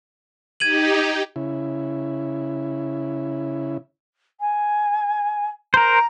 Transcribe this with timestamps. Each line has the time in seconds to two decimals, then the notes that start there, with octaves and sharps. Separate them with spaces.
0.60 D#4 G4 G#6 D#7 F#7
1.36 C#3 E4
4.40 G#5
5.74 A#4 C5 A#5